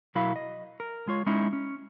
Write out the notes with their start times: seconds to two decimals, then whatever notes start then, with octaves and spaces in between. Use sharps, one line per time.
0.15 B1 F#3 E4 A#4 F5 B5
0.36 D#5
0.80 A#4
1.07 G#3 F4 C#5
1.26 G#3 C#4 D#4 E4
1.53 C#4